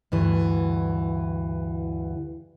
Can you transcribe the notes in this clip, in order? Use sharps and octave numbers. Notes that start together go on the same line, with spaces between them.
D2 G2 E3